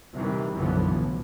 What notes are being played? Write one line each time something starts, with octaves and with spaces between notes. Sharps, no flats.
C3 D#3 E3 G3
B1 F#2 D3 E3 F3 B3
A2